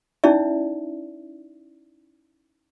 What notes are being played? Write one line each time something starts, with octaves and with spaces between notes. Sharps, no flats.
C#4 D#4 E4 D5 E5